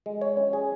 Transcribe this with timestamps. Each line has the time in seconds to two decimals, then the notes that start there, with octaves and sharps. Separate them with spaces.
0.06 G#3
0.21 C#5
0.37 C#4
0.53 G#4